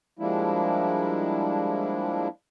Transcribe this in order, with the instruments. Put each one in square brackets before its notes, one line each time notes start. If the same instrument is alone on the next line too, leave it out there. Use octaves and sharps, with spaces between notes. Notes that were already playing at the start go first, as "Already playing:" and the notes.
[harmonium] F3 G3 G#3 A#3 D4 E4